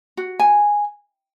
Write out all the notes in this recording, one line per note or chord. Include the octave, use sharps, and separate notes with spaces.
F#4
G#5